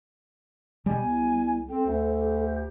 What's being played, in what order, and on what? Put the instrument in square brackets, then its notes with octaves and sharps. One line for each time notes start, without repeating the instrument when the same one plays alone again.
[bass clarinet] B2 [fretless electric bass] G3 [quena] G#5
[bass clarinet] C2 [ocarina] B3
[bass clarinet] C4 [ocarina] A4 [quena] G5
[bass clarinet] D2 [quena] C5
[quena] G4